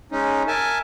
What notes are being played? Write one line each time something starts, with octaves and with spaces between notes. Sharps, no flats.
G#3 C#4 D#4
A#4 E5 G#5 A5